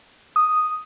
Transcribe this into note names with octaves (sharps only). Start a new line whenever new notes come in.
D#6